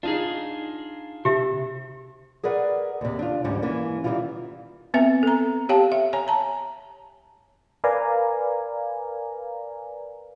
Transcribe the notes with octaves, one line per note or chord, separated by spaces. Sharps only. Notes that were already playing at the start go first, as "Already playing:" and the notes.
D4 D#4 F4 G#4
C3 G4 E5
G#4 A#4 B4 D5 F#5
D#2 C3
D4 F4
D2 G#2 E3 G3 C#4
E3 A#3 C#4
D#3 E3 F#3 G3 E4 F4
B3 C4 B4 E5 G#5
A4 A#5
G4 C#5 F5 G5 A5
E5
C#5 G#5 A#5
A5 A#5
A#4 B4 D5 F5 G#5 A#5